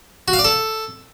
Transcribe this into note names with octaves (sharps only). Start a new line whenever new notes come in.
F#4
F5
D5
A4